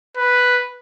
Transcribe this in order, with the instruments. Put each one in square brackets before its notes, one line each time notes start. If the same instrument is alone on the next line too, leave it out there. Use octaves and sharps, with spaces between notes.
[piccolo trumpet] B4